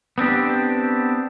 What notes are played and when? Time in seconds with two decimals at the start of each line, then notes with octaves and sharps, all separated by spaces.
0.18 B3 C4 D4 G4